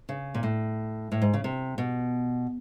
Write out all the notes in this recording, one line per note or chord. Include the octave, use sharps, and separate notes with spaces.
C#3
A#2
A2
A2
G#2
C#3
C3
B2